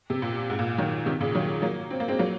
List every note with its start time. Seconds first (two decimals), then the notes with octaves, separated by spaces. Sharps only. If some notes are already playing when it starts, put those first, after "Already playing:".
0.10 C3
0.22 A#2
0.50 G#2
0.59 A#2
0.78 D#3 F#3
1.06 C3 D#3
1.20 A#2 C#3
1.35 D#3 F#3
1.62 F#3 A#3
1.90 C4
2.00 A#3
2.08 G#3 C4
2.19 F#3 A#3